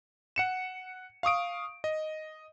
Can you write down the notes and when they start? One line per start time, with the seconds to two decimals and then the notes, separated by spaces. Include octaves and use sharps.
0.36 F#5 C#7 E7
1.23 F5 C#6 D#6 D7
1.84 D#5